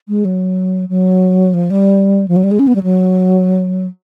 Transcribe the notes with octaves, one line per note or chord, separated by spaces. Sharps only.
G#3
F#3
F#3
F3
G3
F3
F#3
G3
G#3
C#4
B3
G3
F#3